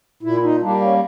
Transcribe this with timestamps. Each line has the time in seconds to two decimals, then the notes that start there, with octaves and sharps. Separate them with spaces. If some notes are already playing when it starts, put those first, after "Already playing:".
0.23 A#2 E4
0.43 D#4
0.62 G3 A#3 D4
0.81 C#4